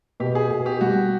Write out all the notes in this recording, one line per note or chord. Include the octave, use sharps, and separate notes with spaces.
B2 G4
G#4
B2 G#4
G4
G3 F#4